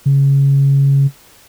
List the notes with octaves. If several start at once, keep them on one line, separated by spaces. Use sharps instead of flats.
C#3